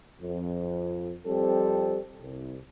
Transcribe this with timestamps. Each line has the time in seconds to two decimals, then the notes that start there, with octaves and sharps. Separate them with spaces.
0.21 F2
1.26 F2 G3 C4 A4
2.21 C2